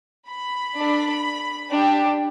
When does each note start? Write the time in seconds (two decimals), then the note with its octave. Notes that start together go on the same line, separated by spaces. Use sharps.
0.29 B5
0.77 D4 A4
1.72 D4 G4